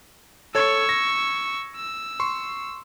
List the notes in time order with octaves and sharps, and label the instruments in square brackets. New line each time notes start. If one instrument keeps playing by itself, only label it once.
[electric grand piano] A4 C#5 G#6 [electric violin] C#6 E6
[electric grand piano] A#6
[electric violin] E6
[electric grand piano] C6 C#6